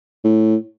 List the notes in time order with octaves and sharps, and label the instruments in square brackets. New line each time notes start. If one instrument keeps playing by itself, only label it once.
[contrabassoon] A2